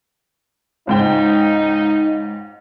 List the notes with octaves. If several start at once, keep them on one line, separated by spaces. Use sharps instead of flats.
C#2 G#2 D#4 G5